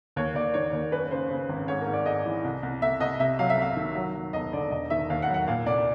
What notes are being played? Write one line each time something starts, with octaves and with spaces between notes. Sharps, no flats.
D#2 C#5
D#2 D5
D#3 C#5
D#2
F#2 B4
C#3 C5
C#3
G#1
G#2 C#5
A#4
G#2
D5
G#2 D#5
E3
C2
C2
C2 E5
C2 D#5
C3 E5
F#3 F5
E5
C2 F5
D#3
F#3
F#3
E1 D#5
D3 D5
E1 D#5
D#3 E5
D#2 F5
F#5
F#3
F#5
A#2 F5
C2 D5